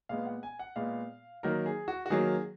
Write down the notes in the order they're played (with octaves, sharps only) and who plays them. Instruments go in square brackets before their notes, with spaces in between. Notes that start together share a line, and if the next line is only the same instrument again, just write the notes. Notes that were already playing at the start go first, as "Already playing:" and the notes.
[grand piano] A#2 G#3 B3 F5
F#5
G#5
F#5
A#2 G#3 B3 F5
D#3 F#3 A#3 A#4
G#4
F#4
F#4
D#3 F#3 A#3 G#4